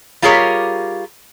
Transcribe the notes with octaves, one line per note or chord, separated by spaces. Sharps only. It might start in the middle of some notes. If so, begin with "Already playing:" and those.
G3 F4 G4 G#4 A#4 C#5